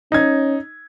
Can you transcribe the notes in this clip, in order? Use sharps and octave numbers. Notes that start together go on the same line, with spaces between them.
C#4 D#4 G#6